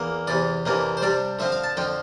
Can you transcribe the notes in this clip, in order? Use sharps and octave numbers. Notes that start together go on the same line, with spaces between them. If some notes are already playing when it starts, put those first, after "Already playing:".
Already playing: E2 A#3
E2 C3 E3 D5
F2 C3 E3 A#3 D4
C5
C3 G3 D4 D5
D3 F3 C4 E5
F5
A5
F2 D3 F3 G5